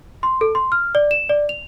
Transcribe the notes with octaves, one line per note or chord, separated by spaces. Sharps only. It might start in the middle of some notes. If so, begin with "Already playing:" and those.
C6
A4
C6
F6
D5
E7
D5
F7